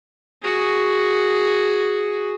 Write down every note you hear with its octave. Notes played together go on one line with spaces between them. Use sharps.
F#4 G#4